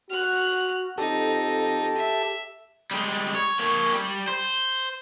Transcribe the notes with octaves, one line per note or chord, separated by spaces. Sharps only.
F#4 F6 F#6
F2 D#4 G4 A4
E5
G3 G#3
C#5
A#3 C#5
G3
C5